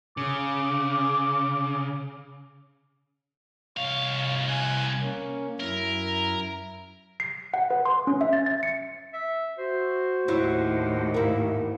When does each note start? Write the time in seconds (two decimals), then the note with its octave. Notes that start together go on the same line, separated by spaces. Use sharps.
0.17 C#3 D6
3.77 C2 C#5 F5
4.47 G#5 F#6 G#6
5.02 A#3 C#4
5.60 F#2 E4 A#4
7.20 C7
7.54 F#5
7.71 B4
7.86 C6
8.07 C#4
8.21 E5
8.33 A6
8.46 A6
8.63 C#7
9.13 E5
9.58 F#4 C5
10.28 D#2 A2 F#3 E4
11.14 G#2 A3 A#3 E4